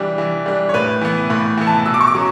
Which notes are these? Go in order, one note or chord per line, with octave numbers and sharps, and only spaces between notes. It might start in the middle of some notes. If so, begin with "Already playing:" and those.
Already playing: E3 G3 D4
E3
G3 D4
C#5
A2 B4
E3 B3
A2
E3 B3
A5
B2 E6
D6
C#6
D6
F#3 C#4